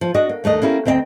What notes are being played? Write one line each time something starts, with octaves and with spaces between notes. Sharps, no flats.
F3
D4 F#4 D#5
A#3
D#2 A3 D4 D#5
A#3 C#4 E4 G4
D2 C4 D#5 F5 G5